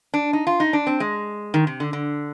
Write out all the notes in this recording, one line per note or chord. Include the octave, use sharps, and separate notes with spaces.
D4
D#4
F4
D#4
D4
C4
G#3
D#3
C3
D3
D3